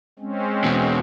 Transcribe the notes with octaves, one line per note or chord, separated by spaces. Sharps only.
G#3 C4 C#4
E2 B2